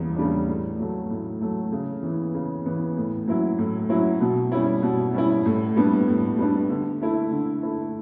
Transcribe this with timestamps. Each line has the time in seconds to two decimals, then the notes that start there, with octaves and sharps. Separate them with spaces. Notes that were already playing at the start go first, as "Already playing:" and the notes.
Already playing: E2 C#3 G3
0.17 C#3 G3 D4
0.47 A2
0.79 F#3 A3
1.10 A2
1.41 F#3 A3
1.72 C#3
2.03 E3 B3
2.34 C#3
2.66 E3 B3
2.97 A2
3.27 F#3 C#4 E4
3.58 A2
3.89 F#3 C#4 E4
4.21 B2
4.52 G3 C#4 E4
4.83 B2
5.14 G3 C#4 E4
5.46 A2
5.76 G3 B3 D4
6.08 A2
6.38 G3 B3 D4
6.69 D3
7.01 A3 E4
7.31 D3
7.63 A3 E4